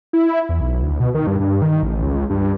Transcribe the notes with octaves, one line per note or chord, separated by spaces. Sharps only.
E4
E2
B1
D2
B2
D#3
G2
G2
D#3
A1
C#2
G2